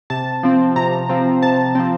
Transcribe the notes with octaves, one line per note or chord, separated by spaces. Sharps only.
C3 A5
F3 C4
C3 A#5
F3 C4
C3 A5
F3 C4